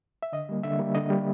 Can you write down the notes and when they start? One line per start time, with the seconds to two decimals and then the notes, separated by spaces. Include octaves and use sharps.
0.23 E5
0.32 D3 D#5
0.49 G3 A#3
0.63 D3 E5
0.79 G3 A#3
0.95 D3 D#5
1.10 G3 A#3